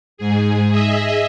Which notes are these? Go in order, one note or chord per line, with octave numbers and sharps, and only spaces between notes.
G#2 G#4
G#4 D#5 E5